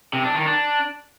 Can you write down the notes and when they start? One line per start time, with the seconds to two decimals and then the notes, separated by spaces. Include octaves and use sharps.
0.13 C3
0.24 D4
0.35 D#3
0.46 D4